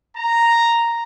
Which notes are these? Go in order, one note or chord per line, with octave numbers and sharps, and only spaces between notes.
A#5